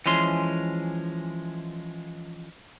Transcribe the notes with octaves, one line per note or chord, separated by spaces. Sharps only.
E3 F3 G#3 C#4 C6